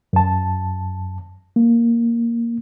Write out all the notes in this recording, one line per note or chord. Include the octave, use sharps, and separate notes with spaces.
F#2 A5
A#3